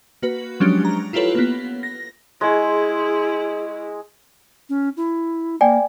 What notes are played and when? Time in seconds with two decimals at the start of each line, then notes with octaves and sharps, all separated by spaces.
0.22 A#3 F#4 B4
0.60 F3 F#3 G#3 C#4 D4 G4
0.85 A#5
1.13 E4 F4 G4 A4 B4 C#5
1.35 A#3 B3
1.83 A#6
2.41 G#3 E4 G#4 C#6
4.69 C#4
4.97 E4
5.61 A#3 D5 G5 G#5